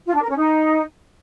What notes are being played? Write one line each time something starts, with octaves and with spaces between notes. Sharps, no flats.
F4
D4
A#4
C#4
D#4